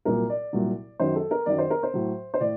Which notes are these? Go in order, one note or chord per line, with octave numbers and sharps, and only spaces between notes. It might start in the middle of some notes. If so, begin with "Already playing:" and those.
C2 A#2 F#3 A#4
D5
C2 A#2 F#3
F#2 D#3 F#3 C5
A4
A#4
F#2 D#3 F#3 D5
C5
A#4
C5
A2 F#3
C5
A2 D5